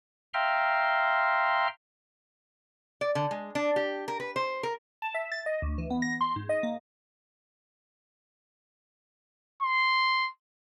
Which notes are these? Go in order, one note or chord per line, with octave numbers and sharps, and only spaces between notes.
E5 F5 G5 A#5 C6 F6
D5
D3
G#3
D4
G4
A#4
B4
C5
A#4
A5
E5
A6
D#5
D2
E3
B3
A#6
C6
G#2
D#5
A#3
C6